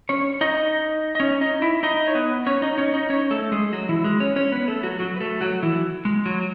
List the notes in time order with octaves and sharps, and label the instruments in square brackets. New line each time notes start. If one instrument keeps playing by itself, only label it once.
[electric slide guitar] C#4 C#5
D#4 D#5
D#5
C#4 C#5
D#4 D#5
E4 E5
D#4 D#5
C#5
B3 B4
C#4 C#5
D#4 D#5
C#4 C#5
D#4 D#5
C#4 C#5
A3 A4
G#3 G#4
F#3 F#4
E3 E4
G#3 G#4
C#4 C#5
C#4 C#5
B3 B4
A3 A4
F#3 F#4
F#3 F#4
B4
A3 A4
F#3 F#4
E3 E4
G#3
F#3